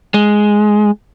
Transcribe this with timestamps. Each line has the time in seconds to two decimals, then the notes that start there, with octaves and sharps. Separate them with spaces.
0.14 G#3